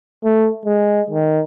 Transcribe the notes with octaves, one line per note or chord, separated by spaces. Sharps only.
A3
G#3
D#3